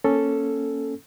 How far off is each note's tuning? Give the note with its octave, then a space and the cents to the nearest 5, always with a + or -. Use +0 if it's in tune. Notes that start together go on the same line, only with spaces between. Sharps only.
A#3 +10 C#4 +0 A4 +0